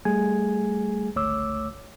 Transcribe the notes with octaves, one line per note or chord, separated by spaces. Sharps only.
G3 A3 G#4 G#5 G#6
G1 C#2 A3 C#5 D6 E6